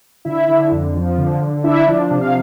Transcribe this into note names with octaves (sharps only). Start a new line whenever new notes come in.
D3 E4 E5
D3
F2
F3
D3
D3
D4 E4 E5
F3
C3
F5